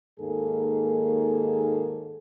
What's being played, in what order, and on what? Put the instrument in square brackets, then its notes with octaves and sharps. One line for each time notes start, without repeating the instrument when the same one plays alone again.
[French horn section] D#2 G#2 A#3 G#4 A4